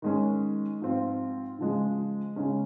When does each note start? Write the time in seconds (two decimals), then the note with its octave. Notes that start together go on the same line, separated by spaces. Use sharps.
0.02 D#3 G#3 C#4
0.80 G#2 F3 C4 F4
1.59 C#3 F3 G#3
2.36 C#3 G#3 C#4